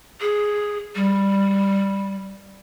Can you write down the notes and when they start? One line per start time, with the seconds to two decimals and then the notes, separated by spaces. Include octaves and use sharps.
0.21 G#4
0.95 G3